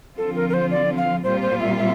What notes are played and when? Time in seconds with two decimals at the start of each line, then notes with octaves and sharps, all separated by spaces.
0.18 D3 F3 C4 F4 A4
0.36 A#4
0.49 A#4
0.53 C5
0.71 D5
0.97 F5
1.24 A#2 G3 C4 F4 C5
1.42 C5
1.60 E5
1.78 E5